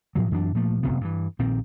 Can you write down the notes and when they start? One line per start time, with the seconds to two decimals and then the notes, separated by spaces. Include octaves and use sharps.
0.15 A2 F3 F#3
0.31 F#2 E3 F#3 D4
0.55 A#2 F3 A3
0.83 F1 D#2 C3 B3
1.01 G2 A#2 E3
1.39 A#1 A#2 D#3 C4